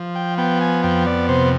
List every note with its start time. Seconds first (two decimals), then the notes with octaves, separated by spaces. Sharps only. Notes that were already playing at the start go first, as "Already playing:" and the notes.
Already playing: F3
0.15 G5
0.38 B3 G5
0.61 G#5
0.83 F2 G5
1.06 D5
1.29 C3 C5